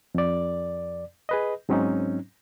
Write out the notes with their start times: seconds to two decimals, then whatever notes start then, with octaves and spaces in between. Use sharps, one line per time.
0.15 F2 D5
1.29 G#4 B4 D#5
1.69 G#2 F#3 C4 C#4 D#4